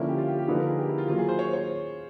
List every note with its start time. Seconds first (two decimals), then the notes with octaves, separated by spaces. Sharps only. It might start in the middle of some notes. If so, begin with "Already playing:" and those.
Already playing: D3 F3 A#3 C#4 E4
0.09 G4
0.18 F4
0.28 G4
0.39 G4
0.48 D3 F3 A#3 D#4 B4
0.58 A#4
0.68 G#4
0.79 G4
0.89 E4
0.98 F4
1.08 D#3 F#3 A#3 F4
1.18 G#4
1.29 C5
1.39 C#5
1.53 C#5